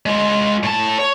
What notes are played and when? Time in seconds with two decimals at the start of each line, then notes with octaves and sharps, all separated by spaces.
0.06 G#3 F4
0.63 A2 A5
0.98 C#5